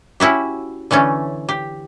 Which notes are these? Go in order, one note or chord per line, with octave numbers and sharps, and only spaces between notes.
C#4 E4 F#4 G4
D3 E3 A3 C#4
G4